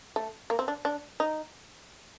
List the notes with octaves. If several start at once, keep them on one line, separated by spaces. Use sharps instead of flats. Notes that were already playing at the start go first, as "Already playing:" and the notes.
A3
A#3
C4
D4
D4
D#4